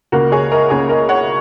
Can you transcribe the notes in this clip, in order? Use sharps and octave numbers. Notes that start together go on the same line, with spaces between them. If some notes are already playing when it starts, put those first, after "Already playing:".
C#2 C#3 A#3 F#4 A#4
G#4 C#5
A#4 D#5
C#2 C#3 A#3 G#4 C#5
A#4 D#5
C#5 F#5